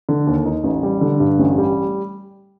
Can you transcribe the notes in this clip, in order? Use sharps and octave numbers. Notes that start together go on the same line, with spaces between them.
D3
D#2
D#4
A1
G3
D3
G2
A1
G3